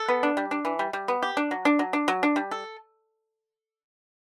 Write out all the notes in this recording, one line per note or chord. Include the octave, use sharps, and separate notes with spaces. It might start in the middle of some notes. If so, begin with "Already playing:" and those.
Already playing: A4
B3
D4
G3
D4
E3
G3
G3
B3
G4
D4
F#3
D4
F#3
D4
F#3
D4
G3
A4